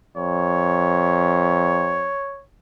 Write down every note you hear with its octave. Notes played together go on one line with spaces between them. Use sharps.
F2 C#5